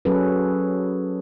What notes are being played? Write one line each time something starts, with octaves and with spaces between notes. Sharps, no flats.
F#3 C#4 G#4 A4 B4